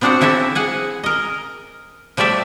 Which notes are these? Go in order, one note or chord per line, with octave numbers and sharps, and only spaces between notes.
B3 C4 D4 F#4 C5 F#5
E3 F3 E4 A4 E5
G#4 F#5 G#5
A#4 D#5
F3 G3 A3 D5 E5